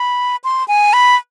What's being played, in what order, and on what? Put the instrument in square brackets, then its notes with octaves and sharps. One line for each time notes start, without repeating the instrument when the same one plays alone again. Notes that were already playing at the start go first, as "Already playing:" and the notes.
Already playing: [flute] B5
C6
G#5
B5